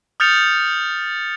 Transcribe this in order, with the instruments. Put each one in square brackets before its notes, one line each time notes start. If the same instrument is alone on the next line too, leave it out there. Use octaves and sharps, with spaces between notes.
[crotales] D#6 F6 G6 A6 C#7 F7